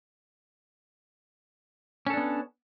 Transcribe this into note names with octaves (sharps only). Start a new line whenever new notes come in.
B3 C#4 D4 A4